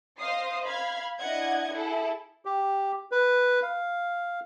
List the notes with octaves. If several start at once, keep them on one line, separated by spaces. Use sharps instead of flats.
C5 D#5 F5 D#6 C7
F5 B5 G#6
D4 E4 D#5 F#5 G#6
E4 G#4 A4
G4
B4
F5